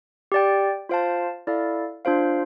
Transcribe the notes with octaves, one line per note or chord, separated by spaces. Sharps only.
G4 D5 G5
F4 C5 F5 A5
E4 A4 D5 F5
D4 F4 C5 F5